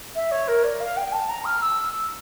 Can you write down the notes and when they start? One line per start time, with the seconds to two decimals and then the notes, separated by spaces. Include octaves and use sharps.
0.15 E5
0.31 C#5
0.48 A#4
0.64 D5
0.80 F5
0.97 G5
1.12 A5
1.29 A#5
1.45 F6
1.61 E6